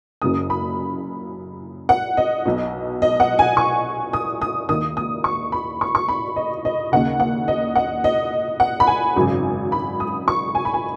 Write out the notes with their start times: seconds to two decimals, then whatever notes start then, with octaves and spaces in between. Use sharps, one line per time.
0.22 F#1 F#2 C#3 D#6
0.50 B5
1.89 F#5
2.17 D#5
2.46 B1 B2
3.02 D#5
3.20 F#5
3.39 G#5
3.57 C#6
4.13 D#6
4.42 D#6
4.69 D#2 D#3 D#6
4.97 D#6
5.24 C#6
5.52 B5
5.81 C#6
5.95 C#6
6.08 B5
6.36 D#5
6.65 D#5
6.92 D#2 C#3 F#5
7.20 F#5
7.48 D#5
7.75 F#5
8.04 D#5
8.60 F#5
8.80 B5
8.87 G#5
9.16 G#1 F#2 C#3
9.72 B5
10.00 D#6
10.28 C#6
10.55 G#5
10.65 B5
10.74 G#5